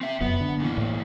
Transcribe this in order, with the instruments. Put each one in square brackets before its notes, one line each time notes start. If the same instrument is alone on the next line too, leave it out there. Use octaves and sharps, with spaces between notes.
[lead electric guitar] C4 E5
[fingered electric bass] F1 F#2 [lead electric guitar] B3
[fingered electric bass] D3
[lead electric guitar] A#2 E3
[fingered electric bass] A2